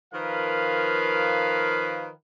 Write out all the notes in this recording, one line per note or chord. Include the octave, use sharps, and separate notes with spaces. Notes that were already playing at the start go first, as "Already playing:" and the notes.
D#3 F3 A#4 B4 F5